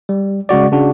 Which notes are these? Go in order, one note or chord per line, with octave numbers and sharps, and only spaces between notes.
G3
C#3 G#3 F#4 D5
C#3 D4 F#4